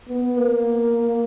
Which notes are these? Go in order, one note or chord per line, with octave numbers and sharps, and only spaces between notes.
B3
A#3